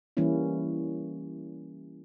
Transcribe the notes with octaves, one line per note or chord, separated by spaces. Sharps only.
E3 G3 A#3 C#4 E4